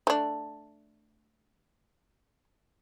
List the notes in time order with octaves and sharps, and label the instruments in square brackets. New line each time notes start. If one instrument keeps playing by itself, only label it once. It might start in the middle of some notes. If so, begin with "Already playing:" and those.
[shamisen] A3 D4